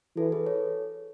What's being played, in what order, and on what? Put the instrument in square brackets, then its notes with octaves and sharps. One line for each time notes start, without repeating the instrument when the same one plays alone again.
[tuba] E3 [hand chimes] F#4 A4
[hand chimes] G#4 B4
A4 C#5